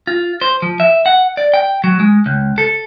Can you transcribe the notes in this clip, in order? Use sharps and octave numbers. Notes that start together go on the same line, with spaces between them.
F4
C5
F3
E5
F#5
D5
G5
F#3
G#3
C#2
A4